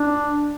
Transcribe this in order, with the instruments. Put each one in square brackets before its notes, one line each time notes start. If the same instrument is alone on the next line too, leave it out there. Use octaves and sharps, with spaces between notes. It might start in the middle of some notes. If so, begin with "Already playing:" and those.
Already playing: [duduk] D4